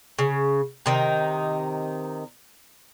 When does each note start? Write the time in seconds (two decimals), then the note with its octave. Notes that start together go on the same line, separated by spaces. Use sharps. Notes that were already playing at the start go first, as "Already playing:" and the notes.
0.19 C#3
0.86 C3 D#3 D#4